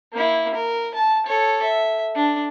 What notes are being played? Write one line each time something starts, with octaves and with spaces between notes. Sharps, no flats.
A#3 E4
A#4
A5
A4 C#5
E5
D4